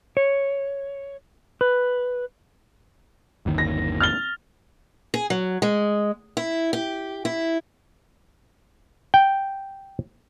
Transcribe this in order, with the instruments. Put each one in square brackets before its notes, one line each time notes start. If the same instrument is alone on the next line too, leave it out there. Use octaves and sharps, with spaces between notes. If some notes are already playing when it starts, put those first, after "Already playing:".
[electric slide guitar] C#5
B4
[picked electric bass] G1 D#2 D#3
[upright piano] A#6
F6 A6 G7
[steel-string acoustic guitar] G#4
F#3
G#3
E4
G4
E4
[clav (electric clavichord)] G5